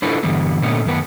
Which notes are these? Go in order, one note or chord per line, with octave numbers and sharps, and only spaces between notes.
D4 E4 F4 A4 B4 C5
G2 D3 E3 G3 B3
A#2 D3 A3 B3 C#4
F#2 A2 D#3 B3 B4